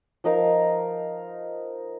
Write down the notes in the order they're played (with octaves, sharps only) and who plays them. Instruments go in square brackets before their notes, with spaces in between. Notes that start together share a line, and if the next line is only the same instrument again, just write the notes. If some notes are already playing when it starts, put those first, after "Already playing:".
[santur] F3 D#4 A#4 F5